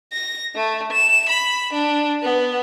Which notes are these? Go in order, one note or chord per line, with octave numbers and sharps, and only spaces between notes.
A#6
A3
E7
B5
D4
B3